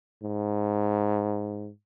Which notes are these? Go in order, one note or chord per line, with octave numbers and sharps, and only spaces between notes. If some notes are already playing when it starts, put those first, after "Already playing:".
G#2